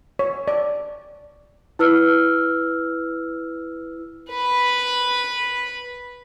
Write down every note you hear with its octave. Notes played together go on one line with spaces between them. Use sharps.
C#5
D5
E4 B4 E6 F6
B4 B5